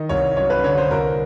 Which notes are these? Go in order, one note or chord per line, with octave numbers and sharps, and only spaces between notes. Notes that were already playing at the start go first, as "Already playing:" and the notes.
Already playing: D#3 D#5
C2 C#5
F#2 C#5
B4
D3 C#5
C5
C2 A#4